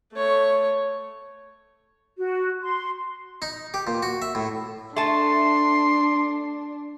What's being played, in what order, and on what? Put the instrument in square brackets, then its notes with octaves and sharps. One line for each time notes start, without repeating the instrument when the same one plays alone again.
[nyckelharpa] A3 C#5
[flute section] F#4
C6
[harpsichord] D#4
G4
A#2
F#4
E5
A2
[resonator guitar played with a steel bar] A3 A5 [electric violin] D4 [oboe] C6